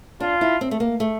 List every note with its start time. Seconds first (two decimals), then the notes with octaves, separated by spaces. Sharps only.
0.20 D4 F4
0.41 E4
0.61 C4
0.71 A3
0.80 A#3
1.00 A3